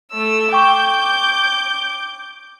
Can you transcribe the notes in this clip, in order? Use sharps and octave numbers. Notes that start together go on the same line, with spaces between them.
A3 E6
G5 C#6 D6 G6